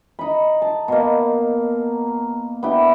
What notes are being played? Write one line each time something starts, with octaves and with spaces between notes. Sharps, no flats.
D#4 D#5 B5
A5
B2 A#3
B3 D4 E4 G4